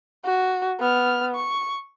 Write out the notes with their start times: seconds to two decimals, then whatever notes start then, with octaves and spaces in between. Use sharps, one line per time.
0.25 F#4
0.80 B3 F6
1.35 C#6